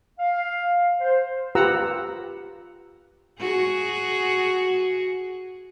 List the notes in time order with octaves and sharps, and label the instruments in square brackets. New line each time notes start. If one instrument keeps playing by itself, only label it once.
[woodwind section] F5
C5
[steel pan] F4 G4 B4 F#5 A#5 E6
[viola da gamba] F#4 G#4